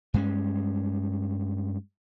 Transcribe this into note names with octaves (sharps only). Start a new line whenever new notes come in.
G2 G#3 C#4